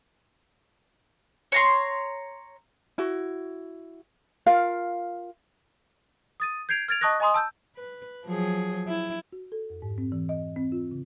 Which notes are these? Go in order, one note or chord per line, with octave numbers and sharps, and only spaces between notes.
C#5 A#5 C6
E4 F#4
F4 A#4 F5
D#6 A6 D#7
G6 G#6 C7 D7 F7
F6 G#6 A6 D7 F7
D#5 A5 C#6 D#6 F#6 A#6
D#5 G#5 A#5 C6 D#6
A5 E6 G6
B4
F3 F#3 G#4
E4
F#4
A4
F2
G#2
C4
E3
D#5
C4
F4
C#3